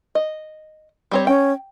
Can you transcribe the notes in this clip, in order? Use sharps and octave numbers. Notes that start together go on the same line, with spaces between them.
D#5
G3 C4 C#5
C#4 G5